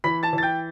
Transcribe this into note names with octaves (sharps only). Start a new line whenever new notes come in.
E3 B5 B6
A5 A6
E3
A6
G5 G6